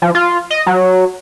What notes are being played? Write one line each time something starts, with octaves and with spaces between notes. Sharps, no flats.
F3
F4
D#5
F#3